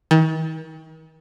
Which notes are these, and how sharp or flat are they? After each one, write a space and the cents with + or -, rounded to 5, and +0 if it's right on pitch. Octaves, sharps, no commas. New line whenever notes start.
D#3 +40